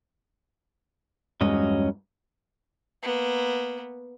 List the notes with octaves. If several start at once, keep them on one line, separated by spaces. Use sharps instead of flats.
E2 G2 F#3 G#3 C#4 D#5
A#3 B3